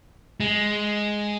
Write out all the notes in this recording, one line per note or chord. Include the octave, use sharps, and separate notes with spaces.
G#3